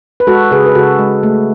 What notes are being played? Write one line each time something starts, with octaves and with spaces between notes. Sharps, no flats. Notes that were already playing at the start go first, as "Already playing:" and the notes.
B4
G#3 F#4 A4
C#3 G#4 B4
B4
C#3 F#4 A4
G#3
A3